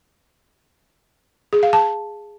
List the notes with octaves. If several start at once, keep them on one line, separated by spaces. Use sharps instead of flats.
G#4
F5
A5